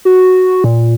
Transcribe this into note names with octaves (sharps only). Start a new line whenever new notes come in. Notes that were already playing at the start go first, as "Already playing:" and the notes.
F#4
A#2